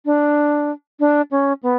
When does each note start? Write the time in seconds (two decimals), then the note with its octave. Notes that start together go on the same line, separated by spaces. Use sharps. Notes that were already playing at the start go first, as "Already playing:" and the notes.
0.06 D4
1.00 D4
1.31 C#4
1.63 B3